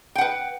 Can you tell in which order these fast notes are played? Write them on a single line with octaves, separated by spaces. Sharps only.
G5 F#5 B4